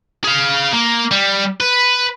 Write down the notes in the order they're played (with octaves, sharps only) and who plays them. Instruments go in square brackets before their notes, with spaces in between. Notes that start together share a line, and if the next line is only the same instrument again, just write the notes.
[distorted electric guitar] G#4 F5
A#3
G3
B4